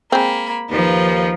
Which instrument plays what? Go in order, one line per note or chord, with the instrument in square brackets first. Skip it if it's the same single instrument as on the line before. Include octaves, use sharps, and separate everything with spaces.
[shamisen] G#3 C4 [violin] A#3 B5
[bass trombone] D#2 [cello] F3 [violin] D#4 B4